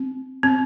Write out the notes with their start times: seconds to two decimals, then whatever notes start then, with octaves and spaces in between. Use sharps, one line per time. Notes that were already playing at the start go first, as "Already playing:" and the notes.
Already playing: C4
0.43 C4